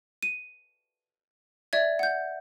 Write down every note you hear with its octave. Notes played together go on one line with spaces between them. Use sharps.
D#7
D5 E5 G#6
F#5 G6